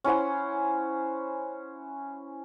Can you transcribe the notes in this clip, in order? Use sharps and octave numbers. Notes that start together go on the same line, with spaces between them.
C#4 E4 C5 F#5